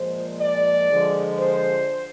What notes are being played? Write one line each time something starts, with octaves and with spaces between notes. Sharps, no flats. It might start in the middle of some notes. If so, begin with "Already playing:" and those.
Already playing: A#2 F3 G#3 C5
D5
D3 F3 G#3
C5